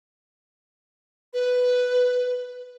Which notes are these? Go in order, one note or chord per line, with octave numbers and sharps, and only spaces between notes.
B4